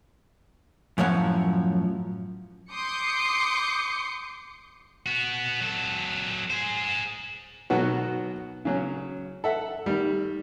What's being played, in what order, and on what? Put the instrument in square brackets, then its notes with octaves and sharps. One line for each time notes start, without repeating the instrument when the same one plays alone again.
[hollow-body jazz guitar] F#2 A2 F3 C#5 F#5
[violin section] C6 D6 D#6 G6 C7 C#7
[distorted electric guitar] B3 F#4
F#3 A4
G#4 C5
[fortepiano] B2 D#3 F#3 B3 F#4
C#3 F#3 C#4
A4 E5 F#5
D#3 G3